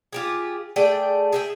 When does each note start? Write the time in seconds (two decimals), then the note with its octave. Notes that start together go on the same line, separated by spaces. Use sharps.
0.13 F4 G4 G#4
0.76 A3 G#4 D5 G5
1.33 G#4 E5 G5